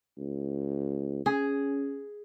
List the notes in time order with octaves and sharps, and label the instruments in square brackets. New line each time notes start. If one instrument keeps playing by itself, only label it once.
[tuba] C#2
[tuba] C#4 [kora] G#4